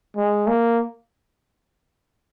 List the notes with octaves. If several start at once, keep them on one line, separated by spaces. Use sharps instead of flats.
G#3
A#3